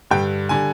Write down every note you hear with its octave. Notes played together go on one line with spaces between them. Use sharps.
G2 D3 G3 G5
D3 G3 G#5